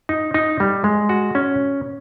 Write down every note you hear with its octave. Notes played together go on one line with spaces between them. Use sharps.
D#4
D#4
G3
G#3
F#4
C#4